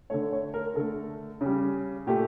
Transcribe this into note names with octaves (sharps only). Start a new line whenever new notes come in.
D3 A3 C#5
C#5
A#4
D3 A3 A4
C#3 G3
A#2 A3 G4